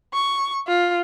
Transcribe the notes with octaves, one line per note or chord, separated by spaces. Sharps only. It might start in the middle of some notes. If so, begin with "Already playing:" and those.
C#6
F4